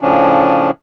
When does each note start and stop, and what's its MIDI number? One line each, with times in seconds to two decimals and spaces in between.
0.01 0.71 45
0.01 0.71 49
0.01 0.71 53
0.01 0.71 61
0.01 0.71 62